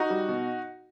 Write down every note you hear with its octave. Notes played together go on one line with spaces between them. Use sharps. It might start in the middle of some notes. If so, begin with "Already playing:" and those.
Already playing: D#4 F#4
G3
B2